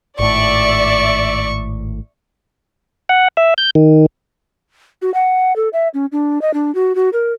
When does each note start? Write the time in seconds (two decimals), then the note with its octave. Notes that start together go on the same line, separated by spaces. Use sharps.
0.19 G#1 A2 D5 E5 C#6
3.09 F#5
3.37 E5
3.58 G6
3.75 D#3
5.02 F#4
5.14 F#5
5.56 A4
5.73 E5
5.94 C#4
6.12 D4
6.42 D#5
6.54 D4
6.75 F#4
6.95 F#4
7.13 A#4